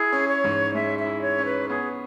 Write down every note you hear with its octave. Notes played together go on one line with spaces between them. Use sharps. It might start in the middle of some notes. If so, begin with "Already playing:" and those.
Already playing: E4 G#4
C#4
C#5
G#2
G#3 E5
E5
E4
C#5
C#4
B4
B3 G#4